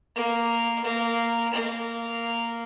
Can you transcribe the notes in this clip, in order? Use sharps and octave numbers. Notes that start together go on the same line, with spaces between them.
A#3
A#3
A#3